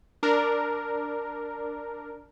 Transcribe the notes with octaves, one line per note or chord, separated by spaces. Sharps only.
D4 A#4